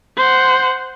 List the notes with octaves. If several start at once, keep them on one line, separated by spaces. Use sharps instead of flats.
C5 F#5